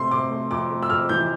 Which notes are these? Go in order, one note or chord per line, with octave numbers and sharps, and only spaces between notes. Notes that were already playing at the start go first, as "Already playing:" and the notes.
Already playing: C3 A3 C6
C3 D6
A3
F2 D6
A3
E6
F2 F6
E3 G6